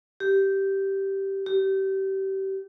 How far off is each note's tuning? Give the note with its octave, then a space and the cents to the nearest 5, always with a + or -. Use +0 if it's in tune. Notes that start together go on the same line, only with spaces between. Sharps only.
G4 -10
G4 -30